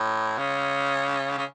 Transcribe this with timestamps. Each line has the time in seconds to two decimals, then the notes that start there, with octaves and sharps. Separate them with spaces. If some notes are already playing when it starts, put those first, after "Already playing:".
Already playing: A2
0.38 C#3
1.38 C#3